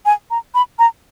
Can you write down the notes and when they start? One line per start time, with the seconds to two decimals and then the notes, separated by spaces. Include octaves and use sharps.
0.06 G#5
0.31 A#5
0.55 B5
0.79 A#5